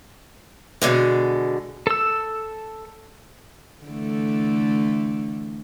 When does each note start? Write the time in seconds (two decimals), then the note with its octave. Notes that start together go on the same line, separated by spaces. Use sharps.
0.82 B2 D3 G#3
1.87 A4 E6
3.85 D3 E3 A3